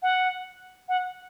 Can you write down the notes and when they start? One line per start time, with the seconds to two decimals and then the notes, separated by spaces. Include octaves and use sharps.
0.02 F#5
0.89 F#5